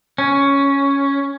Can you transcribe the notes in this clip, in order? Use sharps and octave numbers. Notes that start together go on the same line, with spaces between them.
C#4